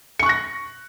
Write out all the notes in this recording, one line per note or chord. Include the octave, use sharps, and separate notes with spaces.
C#6 F#6 A#6 C#7